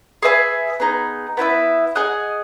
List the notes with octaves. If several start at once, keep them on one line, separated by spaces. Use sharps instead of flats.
G#4 B4 E5 G#5
B3 D#4 G#4
B3 E4 B4 E5
G#4 D#5 F#5